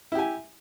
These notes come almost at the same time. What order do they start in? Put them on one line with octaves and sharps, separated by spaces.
E4 G4 G#5